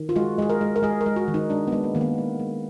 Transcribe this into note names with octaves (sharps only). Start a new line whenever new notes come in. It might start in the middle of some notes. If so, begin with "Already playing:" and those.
Already playing: D#3
F4
G#3 F#4
G#3 G#4
A#4
G#3
A#4
G#3 G#4
A#4
G#3
F#4
D#3
D#4
G#3 D4
B3
G#3
A#3
D#3 A#3
B3
G#3
G#3